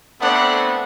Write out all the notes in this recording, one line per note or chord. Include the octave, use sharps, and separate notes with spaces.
A3 B3 C4 D4 F#5